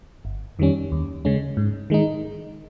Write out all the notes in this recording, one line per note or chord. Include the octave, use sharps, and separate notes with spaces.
G1
F2 D#3 G3 C#4
D#2
C#3 G#3 C#4
G#2
D#3 G#3 D#4